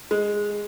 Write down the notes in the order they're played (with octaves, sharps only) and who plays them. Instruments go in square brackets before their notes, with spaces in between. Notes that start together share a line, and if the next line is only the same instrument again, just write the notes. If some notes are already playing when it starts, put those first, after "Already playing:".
[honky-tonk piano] G#3